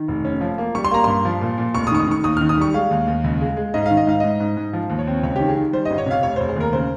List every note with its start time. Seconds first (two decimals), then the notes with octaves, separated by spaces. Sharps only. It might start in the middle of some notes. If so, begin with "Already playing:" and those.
Already playing: D#3
0.08 F1
0.25 C#4
0.41 F3
0.58 A#3
0.75 G3 C#6
0.85 C6
0.91 A#3 A#5
1.04 G2 C6
1.25 F3
1.41 A#2
1.58 A#2
1.74 F1 C#6
1.87 D#6
1.91 D#3 C#6
1.99 D#6
2.07 D#3 C#6
2.24 D#2 D#6
2.37 D#3 F6
2.49 D#6
2.57 G3 C#6
2.74 G#3 F5
2.91 D#2
3.08 D#2
3.24 C#2
3.41 G#3
3.57 G#3
3.74 G#2 D#5
3.86 D#3 F5
3.97 D#5
4.07 G#2 F5
4.20 G#2 D#5
4.40 G#2
4.57 G#2
4.73 F3
4.90 D#2
4.99 C#5
5.07 C4
5.23 C#2 C#5
5.36 D#3 G4
5.48 G#4
5.56 D#3
5.73 G3 C5
5.85 G1 D#5
5.98 C#5
6.06 C3 F5
6.23 F1 C#5
6.36 F1 C5
6.49 G#4
6.56 D#2 A#4
6.73 C#3 C5